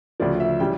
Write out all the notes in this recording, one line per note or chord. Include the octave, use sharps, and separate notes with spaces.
D2 C#3 F3 D5
E5
C#3 E3 G3 G5